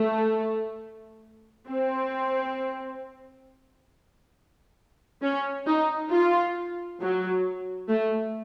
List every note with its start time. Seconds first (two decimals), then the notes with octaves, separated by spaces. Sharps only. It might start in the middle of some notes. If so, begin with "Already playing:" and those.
Already playing: A3
1.67 C4
5.22 C#4
5.66 D#4
6.11 F4
7.00 F#3
7.89 A3